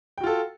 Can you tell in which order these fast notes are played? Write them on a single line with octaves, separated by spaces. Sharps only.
G5 F#4 F4 A4